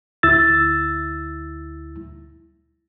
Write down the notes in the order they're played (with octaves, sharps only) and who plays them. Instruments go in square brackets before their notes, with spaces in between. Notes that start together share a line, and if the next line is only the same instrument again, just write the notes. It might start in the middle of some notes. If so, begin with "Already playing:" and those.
[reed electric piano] D2 E4 E6 A6